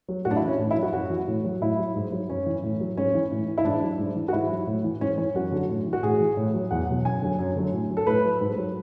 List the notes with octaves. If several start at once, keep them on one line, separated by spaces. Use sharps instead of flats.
F#3
A2 F#4
D4
E4
E3
C#4
A2
E4
F#3
F#4
F#2 F#4
E3
A2
F#3
A2 E4
F#3
G#2
F#3
F#2 C#4
E3
A2
F#3
G#2 C#4
E3
A2
E3
E4
G#2 D4
F#3
G#2
E3
F#4
G#2 E4
F#3
A2
E3
G#2 C#4
E3 C#4
F#2 F#4
D3 F#3
A2
E3
F#4
A2 G#4
E3
A2
F#3
E2 F#5
B2 F#3
F#2 G#5
D3 F#3
F#2
D3 F#3
A2
F#3
A4
A2 B4
F#3
G#2
F#3